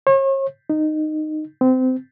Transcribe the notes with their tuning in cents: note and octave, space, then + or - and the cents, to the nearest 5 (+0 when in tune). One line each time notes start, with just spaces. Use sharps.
C#5 -40
D#4 -15
C4 -25